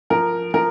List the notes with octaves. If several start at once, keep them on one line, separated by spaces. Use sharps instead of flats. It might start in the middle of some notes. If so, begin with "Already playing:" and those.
F3 A#4
F3 A#4